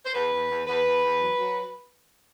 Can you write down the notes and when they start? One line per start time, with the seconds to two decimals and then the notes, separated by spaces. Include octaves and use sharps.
0.05 C5
0.14 E2 B4
0.31 E2
0.49 E2
0.67 E2 B4
0.85 E2
1.02 E2
1.20 F#3
1.37 F#3